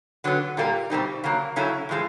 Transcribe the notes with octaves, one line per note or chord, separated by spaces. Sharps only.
D3 F#3 B3
A#2 G3 A#3
B2 G3 C4 D#4
C#3 F#3 A#3
C#3 F#3 A3 C#4 E4
A2 F3 G#3